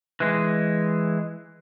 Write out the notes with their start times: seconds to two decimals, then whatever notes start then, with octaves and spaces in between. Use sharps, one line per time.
0.20 E3 G#3